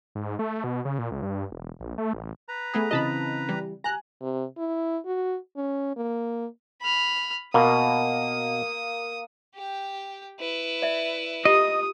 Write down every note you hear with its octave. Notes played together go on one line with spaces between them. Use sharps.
G#2
A3
B2
C#3
A#2
C#2
G2
E1
A#1
A3
A1
B4 A#5
A3 B3 G#4
C#3 E3 C4 D#5 A5 B5
E3 G3
G#5 A#5 F#6
C3
E4
F#4
C#4
A#3
B5 F6
B2 A#3 D#6
G4 G5
E4 B4
D5 E5
F4 G4 D#5 D#6